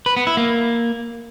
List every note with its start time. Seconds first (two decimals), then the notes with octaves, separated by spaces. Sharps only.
0.06 B4
0.17 B3
0.27 E4
0.37 A#3